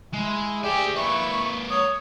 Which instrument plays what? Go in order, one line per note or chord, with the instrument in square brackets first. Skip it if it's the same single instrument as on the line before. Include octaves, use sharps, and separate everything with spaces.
[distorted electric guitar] G#3 [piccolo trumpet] E4
[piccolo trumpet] G4 [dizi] G#4 [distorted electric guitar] D5 E5
[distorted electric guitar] A#3 B4 [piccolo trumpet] E4 [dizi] C#6
[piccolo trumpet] C#5 [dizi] D#6